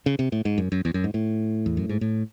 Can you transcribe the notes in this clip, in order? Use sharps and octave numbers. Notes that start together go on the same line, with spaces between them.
C#3
C3
A2
G#2
F#2
F#2
E2
F#2
G#2
A2
E2
F#2
G#2
A2